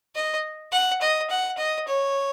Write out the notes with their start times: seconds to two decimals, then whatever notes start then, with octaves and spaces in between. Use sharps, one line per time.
0.15 D#5
0.72 F#5
1.01 D#5
1.30 F#5
1.58 D#5
1.88 C#5